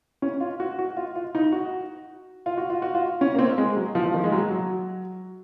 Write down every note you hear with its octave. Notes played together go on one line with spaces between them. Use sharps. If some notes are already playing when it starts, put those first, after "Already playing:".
C#4
F4
F#4
F#4
F4
F4
D#4
F#4
F4
F#4
F4
F#4
F4
C#4
A#3
C4
G#3
F#3
F3
F3
D#3
G#3
F#3
F#3